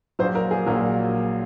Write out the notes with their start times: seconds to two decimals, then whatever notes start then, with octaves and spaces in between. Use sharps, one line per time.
0.19 A#1 A#2 F#3 C5
0.35 A#4
0.51 G#4
0.66 A#1 A#2 F#3 A#4